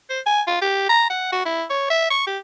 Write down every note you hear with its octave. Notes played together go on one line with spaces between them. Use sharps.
C5
G#5
F4
G4
A#5
F#5
F#4
E4
C#5
E5
C#6
G4